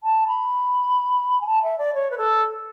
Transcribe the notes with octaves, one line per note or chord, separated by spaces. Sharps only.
A5
B5
G#5
A5
E5
D5
C#5
B4
A4